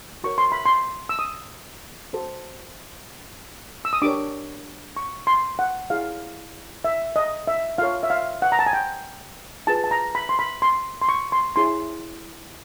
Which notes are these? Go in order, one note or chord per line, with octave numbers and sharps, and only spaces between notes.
F#4 A#4 C#5 C#6
C6
B5
C6
E6
D#6
F#4 A4 C5
E6
D#6
D4 G4 A#4 C#5 D6
C#6
C6
F#5
E4 G#4 C#5 F5
E5
D#5
E5
F4 A4 C#5 F5
E5
F5
F#5
A#5
A5
G#5
G5
F4 G#4 B4 A5
A5
A#5
B5
C6
B5
C6
C6
C#6
C6
E4 G#4 C#5 C6